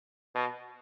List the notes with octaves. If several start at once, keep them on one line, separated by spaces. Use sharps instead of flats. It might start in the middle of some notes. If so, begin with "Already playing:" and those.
B2